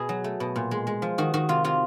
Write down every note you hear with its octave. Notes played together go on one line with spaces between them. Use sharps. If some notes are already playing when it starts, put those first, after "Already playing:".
Already playing: B2 G#4
F#3
A3
B2
A#2
G#3
G#3
F3
D#3 F#4
D#3 F#4
C3 F4
C3 F4